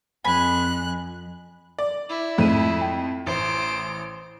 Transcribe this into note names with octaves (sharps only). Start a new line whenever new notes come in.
F2 G#5 B5 F#6
D5
E4
F2 G#2 F3 A3 D#7
G5
A1 C5 D7